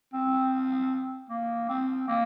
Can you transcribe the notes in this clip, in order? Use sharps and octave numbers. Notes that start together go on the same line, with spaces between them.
C4
A#3
C4
A#3